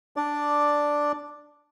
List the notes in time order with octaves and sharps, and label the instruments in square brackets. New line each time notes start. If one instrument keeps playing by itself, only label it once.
[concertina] D4 D5